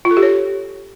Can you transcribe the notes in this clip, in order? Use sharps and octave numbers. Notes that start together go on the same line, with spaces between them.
F4
A4
G4
C#5